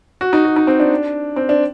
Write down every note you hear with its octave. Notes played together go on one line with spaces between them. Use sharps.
F#4
D#4
F#4
D#4
C4
D4
C4
D4